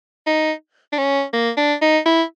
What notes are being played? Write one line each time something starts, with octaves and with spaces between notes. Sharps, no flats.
D#4
D4
C#4
A#3
D4
D#4
E4